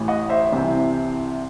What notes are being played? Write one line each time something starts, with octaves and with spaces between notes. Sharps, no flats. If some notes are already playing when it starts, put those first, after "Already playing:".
Already playing: A1 A2 E3
D#5 F#5
C5 E5
C2 C3 E3